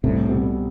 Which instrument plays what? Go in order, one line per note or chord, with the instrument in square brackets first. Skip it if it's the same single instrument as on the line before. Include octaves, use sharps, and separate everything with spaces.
[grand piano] C2 [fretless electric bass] A2 C3
[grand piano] B2 G3 C4